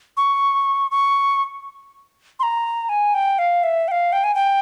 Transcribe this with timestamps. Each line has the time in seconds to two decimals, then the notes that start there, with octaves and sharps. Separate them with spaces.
0.17 C#6
0.91 C#6
2.39 C6
2.43 A#5
2.89 G#5
3.14 G5
3.39 F5
3.63 E5
3.88 G5
3.91 F5
4.12 G5
4.24 G#5
4.35 G5